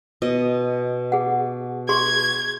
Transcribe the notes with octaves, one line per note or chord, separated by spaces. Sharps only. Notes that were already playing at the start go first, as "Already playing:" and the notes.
B2 D#5
G#4 F#5
G#4 C6 C#6 G#6